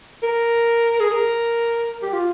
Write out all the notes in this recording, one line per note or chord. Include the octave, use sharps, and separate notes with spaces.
A#4
G#4
A#4
G4
F4